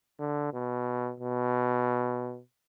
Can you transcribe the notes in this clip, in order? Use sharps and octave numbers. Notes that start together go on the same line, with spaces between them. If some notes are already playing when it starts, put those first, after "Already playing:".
D3
B2
B2